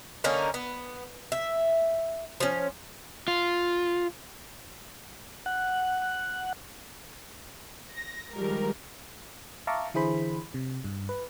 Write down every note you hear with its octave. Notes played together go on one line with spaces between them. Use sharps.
D3 A#3 C#4 D#4
B3
E5
F3 C#4
F4
F#5
A#6
D#3 F3 G3 G#3 A#4
E5 F5 A5 A#5 C#6 D6
D3 E3 E4 G#4 C5 B5
C3
G2
B4